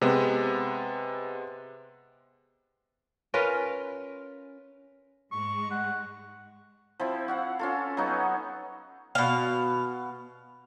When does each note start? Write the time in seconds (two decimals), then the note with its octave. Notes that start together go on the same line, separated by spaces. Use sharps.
0.01 C3 G#3 B3
3.34 C#4 F4 A#4 B4
5.32 G#2 G#3 C#6
5.71 F#5
7.00 F3 C4 E4
7.28 F#4 F5 F#5
7.59 C#4 F4 A4
7.97 F#3 B3 D#4 F#4
9.15 B2 F5